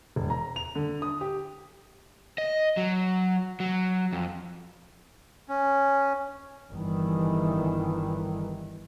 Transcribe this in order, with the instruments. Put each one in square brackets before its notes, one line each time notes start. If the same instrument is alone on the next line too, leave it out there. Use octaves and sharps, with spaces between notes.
[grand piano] E1
A#5
F7
D3
D#6
G4
[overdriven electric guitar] D#5
F#3
F#3
F2
[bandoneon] C#4
[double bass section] G1 D#3 E3